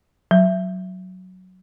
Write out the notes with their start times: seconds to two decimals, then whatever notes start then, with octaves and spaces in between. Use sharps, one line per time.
0.31 F#3